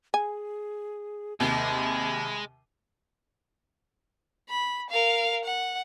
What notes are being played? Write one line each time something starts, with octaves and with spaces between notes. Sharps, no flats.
G#4 G#5
D#2 C3 G#3 B5
B5
A#4 F5
F#5